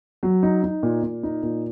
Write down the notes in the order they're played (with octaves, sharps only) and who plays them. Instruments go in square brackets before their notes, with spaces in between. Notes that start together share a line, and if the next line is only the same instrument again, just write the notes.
[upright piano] F#3
D#4
D#4
A#2
A#2
D#4
A#2